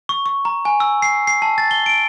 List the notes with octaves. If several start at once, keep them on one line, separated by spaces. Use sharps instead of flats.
C#6
C#6
A#5
G#5
E6
C7
C7
A5
A6
G7
D7